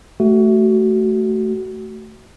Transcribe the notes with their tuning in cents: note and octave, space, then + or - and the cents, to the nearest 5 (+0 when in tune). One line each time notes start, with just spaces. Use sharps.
A3 +0 F#4 +25